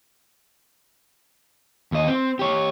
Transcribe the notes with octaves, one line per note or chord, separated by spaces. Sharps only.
D#2 D#5
C4
G4 C#5